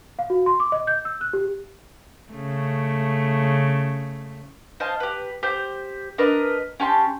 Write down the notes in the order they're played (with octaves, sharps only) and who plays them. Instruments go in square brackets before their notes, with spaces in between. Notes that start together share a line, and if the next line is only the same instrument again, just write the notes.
[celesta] F5
F#4
C6
D6
D#5
G6
E6
F#6
G4
[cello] C#3 A3
[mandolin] C5 D#5 F5 A5
G4 B4
G4 C5 G6
D4 A#4 B4 D#5
C#4 G4 A5 C6